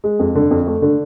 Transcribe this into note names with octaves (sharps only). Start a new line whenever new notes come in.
G#3
F2
D3
F2
A3
D3